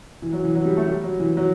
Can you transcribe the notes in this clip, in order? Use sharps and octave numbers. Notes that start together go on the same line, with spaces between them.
E3
F#3
E3
F#3
G3
A3
G3
F#3
E3
F#3